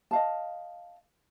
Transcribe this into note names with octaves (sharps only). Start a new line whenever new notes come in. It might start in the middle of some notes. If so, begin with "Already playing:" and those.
D#5 F5 A5